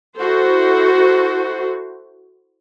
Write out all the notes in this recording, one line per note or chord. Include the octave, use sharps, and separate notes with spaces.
E4 F#4 A4 C5